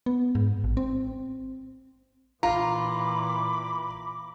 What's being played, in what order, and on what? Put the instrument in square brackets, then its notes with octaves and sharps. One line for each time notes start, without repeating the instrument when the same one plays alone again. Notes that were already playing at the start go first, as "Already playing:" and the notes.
[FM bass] B3
G#2
A1
C4
[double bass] A#2 E3 [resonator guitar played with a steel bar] F4 [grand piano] A#5 [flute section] B5 D6